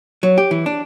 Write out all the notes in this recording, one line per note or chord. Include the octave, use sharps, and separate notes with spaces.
F#3
G4
E3
D4